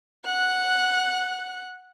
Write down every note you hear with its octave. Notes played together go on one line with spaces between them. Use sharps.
F#5 F#6